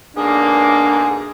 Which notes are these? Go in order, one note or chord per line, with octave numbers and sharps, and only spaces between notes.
B1 G#2 A#3 D4 G#4